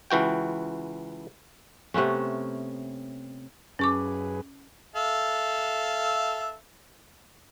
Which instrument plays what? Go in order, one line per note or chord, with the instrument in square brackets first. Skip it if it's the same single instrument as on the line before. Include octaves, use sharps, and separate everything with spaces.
[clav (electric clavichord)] C#2 E3 F#4 G5
[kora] C3 A3 B3 C#4
[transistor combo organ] F#2 G#4 B4 [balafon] C#4 C#6 D6
[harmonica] A4 E5 F5